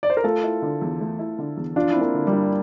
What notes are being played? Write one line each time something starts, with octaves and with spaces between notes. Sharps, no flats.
D5
C5
A#4
A3 F4 A4
E4
D3
E2
A3
E4
D3
E2
F3 D4 F4
C4 E4
A#3 D4
D3
G3 A#3
G2